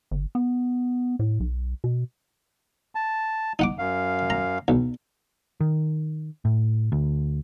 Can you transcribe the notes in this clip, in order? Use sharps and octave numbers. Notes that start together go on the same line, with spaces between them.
G1
B3
A2
B1
B2
A5
D#4 F#5 D6
F#2 F5
A#5
B1
D#3
A2
D2